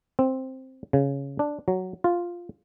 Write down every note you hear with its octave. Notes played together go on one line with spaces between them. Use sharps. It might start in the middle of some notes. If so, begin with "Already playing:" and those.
C4
C#3
D4
F#3
F4